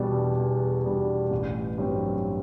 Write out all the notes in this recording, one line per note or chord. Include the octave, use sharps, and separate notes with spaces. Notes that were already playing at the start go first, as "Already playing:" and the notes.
Already playing: E2 B2 G3 D4
E2
B2 G3 D4
A1
G2 F#3 C4